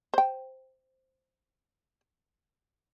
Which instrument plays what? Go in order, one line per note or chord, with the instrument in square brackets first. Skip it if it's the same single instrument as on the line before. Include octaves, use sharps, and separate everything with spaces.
[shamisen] C5 G5